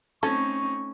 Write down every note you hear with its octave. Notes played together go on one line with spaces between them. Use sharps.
A3 C4 C#4 D#4 A4 C#6